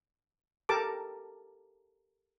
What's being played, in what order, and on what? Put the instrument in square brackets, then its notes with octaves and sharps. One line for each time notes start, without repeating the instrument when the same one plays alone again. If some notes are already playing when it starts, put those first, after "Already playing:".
[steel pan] G4 A4 A#4 A5 D6